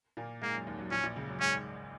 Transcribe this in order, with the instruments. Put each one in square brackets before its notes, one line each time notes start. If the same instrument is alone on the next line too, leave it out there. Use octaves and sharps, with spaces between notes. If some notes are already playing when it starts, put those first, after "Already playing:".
[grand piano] A#2 A#3
[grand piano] G#2 G#3 [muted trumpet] A#3
[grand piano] F#2 F#3
D#2 D#3
F#2 F#3
[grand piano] A#1 A#2 [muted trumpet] C#4
[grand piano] A#1 A#2
C#2 C#3
F#2 F#3
[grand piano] G#2 G#3 [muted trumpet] C#4